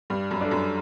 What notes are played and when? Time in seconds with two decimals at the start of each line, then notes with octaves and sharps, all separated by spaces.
0.10 G2 G3
0.31 F#2
0.41 D4 A4
0.51 F#2